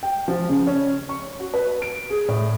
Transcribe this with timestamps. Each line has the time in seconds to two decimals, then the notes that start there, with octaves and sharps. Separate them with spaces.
0.03 G5
0.28 F3
0.49 C#3
0.67 C#4
1.09 C#6
1.40 F#4
1.54 B4
1.82 D7
2.10 G#4
2.28 A2